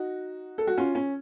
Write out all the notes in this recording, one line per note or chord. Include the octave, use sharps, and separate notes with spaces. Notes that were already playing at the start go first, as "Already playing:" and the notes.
Already playing: D#4 F#4
A4
F#4
C#4 F4
C#4